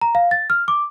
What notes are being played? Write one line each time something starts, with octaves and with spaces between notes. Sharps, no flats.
A#5
F5
A6
F6
D6